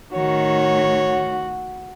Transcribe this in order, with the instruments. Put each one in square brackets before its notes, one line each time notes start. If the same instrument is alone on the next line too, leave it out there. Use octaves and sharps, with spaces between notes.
[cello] A2 D#3 [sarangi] F#4 [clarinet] C#5